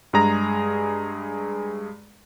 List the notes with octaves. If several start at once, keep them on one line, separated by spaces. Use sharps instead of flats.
G2 G#3 G#4 A#5 A#6